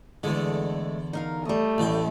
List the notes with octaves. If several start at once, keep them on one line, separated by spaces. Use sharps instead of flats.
E2 D3 G#3 A3
D#4 A#4 F5
G3 A3 D#5
A1 A2 G5